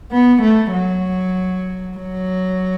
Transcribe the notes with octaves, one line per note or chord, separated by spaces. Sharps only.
B3
A3
F#3
F#3